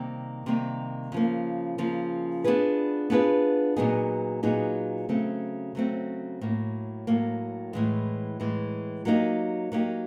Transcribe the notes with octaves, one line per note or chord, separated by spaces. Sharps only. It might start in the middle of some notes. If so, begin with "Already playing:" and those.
Already playing: C3 D#3 G3 A#3
C3 D#3 G3 A#3
C#3 F3 A#3
C#3 F3 A#3
B3 D4 F4 G#4 B4
B3 D4 F4 G#4 B4
A#2 F#3 B3 D#4 G#4
A#2 F#3 B3 D#4 G#4
C#3 F#3 A3 C4
C#3 F#3 A3 C4
A2 F#3 A#3
A2 F#3 A#3
A2 E3 G#3
A2 E3 G#3
F#3 A#3 D#4 G4
F#3 A#3 D#4 G4